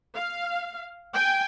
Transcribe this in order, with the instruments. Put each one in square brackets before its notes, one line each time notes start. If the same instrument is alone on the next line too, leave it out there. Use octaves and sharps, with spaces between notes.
[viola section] F5
G5 G#5